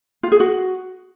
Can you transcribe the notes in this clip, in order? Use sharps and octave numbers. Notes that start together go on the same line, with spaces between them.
F4
G#4
F#4